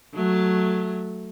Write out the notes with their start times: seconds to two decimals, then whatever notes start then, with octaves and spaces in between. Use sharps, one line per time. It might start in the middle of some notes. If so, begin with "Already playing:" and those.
0.14 F#3 A3